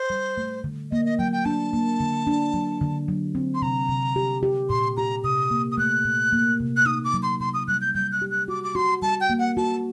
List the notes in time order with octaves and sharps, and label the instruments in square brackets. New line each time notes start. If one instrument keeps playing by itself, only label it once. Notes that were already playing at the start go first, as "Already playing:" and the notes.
Already playing: [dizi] C5
[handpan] G3
A3
D3
[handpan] A#3 [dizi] D#5
[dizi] D#5
[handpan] F#3 [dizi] G5
[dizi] G5
[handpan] D4 [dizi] A5
[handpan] A#3
D3
D4
F#3
D3
F#3
C4
[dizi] C6
[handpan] C3 [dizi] A#5
[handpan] C3
G4
G4
[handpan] A#2 [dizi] C6
[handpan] G4 [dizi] A#5
[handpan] C3 [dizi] D#6
[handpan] A#3
[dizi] D#6
[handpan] A3 [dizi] F#6
[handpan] A#2
A#3
C3
[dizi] F#6
[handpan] D#4 [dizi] D#6
[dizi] D6
[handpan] F#3
[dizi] C6
[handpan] C3 [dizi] C6
[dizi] D#6
[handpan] G3 [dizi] F#6
[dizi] G6
[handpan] G3 [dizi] G6
[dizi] F#6
[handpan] G4
[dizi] F#6
[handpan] F#4 [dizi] D6
[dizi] D6
[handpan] F#4 [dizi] C6
[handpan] G3 [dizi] A5
[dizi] G5
[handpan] A#3
[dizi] F#5
[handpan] F#4 [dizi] A5